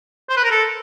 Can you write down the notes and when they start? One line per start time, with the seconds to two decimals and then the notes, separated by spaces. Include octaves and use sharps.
0.29 C5
0.37 B4
0.44 A#4
0.51 A4